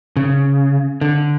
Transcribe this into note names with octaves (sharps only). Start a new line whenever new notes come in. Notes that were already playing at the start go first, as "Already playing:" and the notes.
C#3
D3